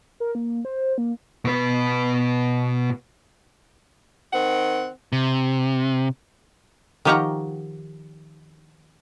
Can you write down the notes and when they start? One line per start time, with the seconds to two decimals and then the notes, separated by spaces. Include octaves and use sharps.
0.20 A#4
0.35 A#3
0.65 C5
0.98 A#3
1.45 B2 B4
4.33 D#3 C4 F#5
5.12 C3
7.05 D#3 F3 G4 C#5 F#5 A#5